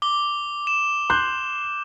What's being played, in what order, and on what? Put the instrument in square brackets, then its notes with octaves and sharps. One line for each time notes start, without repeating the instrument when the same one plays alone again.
[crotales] D6 G7
E7
[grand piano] C6 F#6 G6